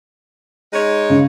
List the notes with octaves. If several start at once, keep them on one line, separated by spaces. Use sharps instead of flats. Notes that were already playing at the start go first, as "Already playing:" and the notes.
G#3 D#4 C#5
C#3